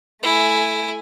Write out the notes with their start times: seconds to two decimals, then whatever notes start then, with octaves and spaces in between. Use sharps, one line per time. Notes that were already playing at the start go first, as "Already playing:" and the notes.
0.23 A3 E4 G#5